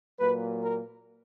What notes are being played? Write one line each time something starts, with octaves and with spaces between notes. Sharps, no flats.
A#2 F#3 A#3 B4
A#4